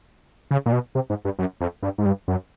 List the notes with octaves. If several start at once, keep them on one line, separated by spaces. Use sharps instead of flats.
C#3
A#2
B2
C3
G#2
G2
F#2
F2
G2
G#2
G2
F#2